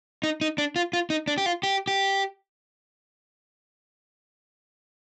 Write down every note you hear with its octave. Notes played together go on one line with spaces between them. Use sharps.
D#4
D#4
D4
F4
F4
D#4
D4
G4
F4
G4
G4